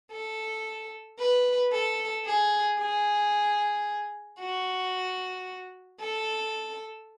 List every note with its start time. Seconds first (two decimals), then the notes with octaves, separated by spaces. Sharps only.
0.12 A4
1.19 B4
1.72 A4
2.26 G#4
2.79 G#4
4.40 F#4
6.00 A4